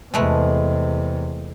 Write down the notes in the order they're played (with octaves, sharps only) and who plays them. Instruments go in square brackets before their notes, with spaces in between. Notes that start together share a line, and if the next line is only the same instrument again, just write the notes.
[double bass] E2 C3 [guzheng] G#3 A3 B4